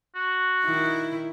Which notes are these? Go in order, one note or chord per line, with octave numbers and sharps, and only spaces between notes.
F#4
D#3 E4